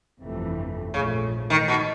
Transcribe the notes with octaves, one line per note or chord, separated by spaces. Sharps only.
G1 F2 C3 E3 A3
A#1 G#2 C#3 F3 A3
D#3
B2